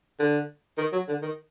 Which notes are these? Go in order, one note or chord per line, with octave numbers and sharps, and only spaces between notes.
D3
D#3
F#3
D3
D#3